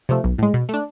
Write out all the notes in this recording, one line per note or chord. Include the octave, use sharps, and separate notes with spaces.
C3 F3 A3
B1
A2 G#3
B2
A3 D4